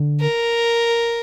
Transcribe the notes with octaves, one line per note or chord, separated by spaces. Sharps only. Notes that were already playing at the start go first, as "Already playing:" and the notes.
Already playing: D3
A#4